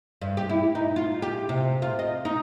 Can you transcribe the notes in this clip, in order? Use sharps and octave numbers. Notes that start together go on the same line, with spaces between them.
G2
G4
E4
D#4
F4
G4
C3
F4
D#5
D#4